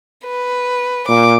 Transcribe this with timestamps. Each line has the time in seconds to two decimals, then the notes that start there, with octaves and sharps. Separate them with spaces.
0.25 B4
1.09 A#2 D6